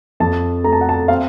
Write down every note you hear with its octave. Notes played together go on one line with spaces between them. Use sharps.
F2 A5
A3 A#5
A5
F#5
A5
C4 F5